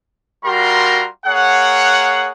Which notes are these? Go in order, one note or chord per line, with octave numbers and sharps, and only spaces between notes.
G3 F4 F#4 A#4 A#5 C6
A#3 G#4 C#5 F#5